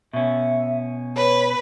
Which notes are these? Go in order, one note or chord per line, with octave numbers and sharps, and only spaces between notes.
B2 C#4 E5
B4 C#5